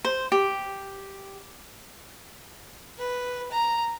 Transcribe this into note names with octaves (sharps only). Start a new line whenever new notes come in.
C5
G4
B4
A#5